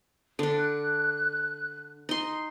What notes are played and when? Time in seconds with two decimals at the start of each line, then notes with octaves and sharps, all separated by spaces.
0.39 D3 D4
0.55 F#6
2.09 D#4 C6